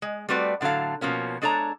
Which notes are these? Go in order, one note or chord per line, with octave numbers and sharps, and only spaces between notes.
G#3
G3 A3 C4 F#4 B4 D5
A2 D3 F#3 A4 F5
B2 F3 A#3 C#4
G#3 D4 A4 C#5 A#5